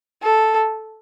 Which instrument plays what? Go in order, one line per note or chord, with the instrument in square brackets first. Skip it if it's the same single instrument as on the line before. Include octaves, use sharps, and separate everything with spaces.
[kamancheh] A4